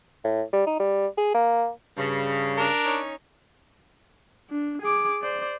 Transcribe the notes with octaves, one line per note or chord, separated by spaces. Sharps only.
A2
G3
D#4
G3
G#4
A#3
G2 C#3
D4 A#4
C#4 D#4 C#5
D4
G#4 D6
C5 D5